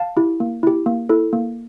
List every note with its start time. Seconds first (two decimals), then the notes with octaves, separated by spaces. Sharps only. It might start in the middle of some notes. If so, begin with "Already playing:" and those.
Already playing: F5 A5
0.17 E4 G4
0.40 A#3
0.63 E4 G4
0.86 A#3
1.09 E4 A4
1.33 A#3